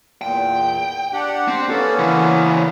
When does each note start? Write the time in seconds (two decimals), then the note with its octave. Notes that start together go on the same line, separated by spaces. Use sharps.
0.22 E2 A#2 G5
1.13 D4 G4 F#5
1.48 C4
1.70 A#3 B3 C#4 A4
1.99 C#3 E3